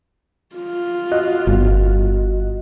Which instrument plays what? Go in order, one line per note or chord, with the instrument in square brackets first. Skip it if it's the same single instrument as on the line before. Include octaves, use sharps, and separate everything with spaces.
[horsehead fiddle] F4
[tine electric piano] F#4 D#5 F#6
[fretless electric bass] G1